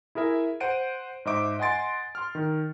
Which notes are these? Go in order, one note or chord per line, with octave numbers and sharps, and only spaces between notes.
E4 G#4 A#4 E5
C5 F#5 D7 D#7
G#2 C5 D#5 E5 D6 D7
D#5 F#5 G#5 C6 A6 D7
C6 F6
D#3